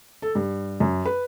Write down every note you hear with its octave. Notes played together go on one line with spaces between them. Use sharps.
A4
G2
F#2
B4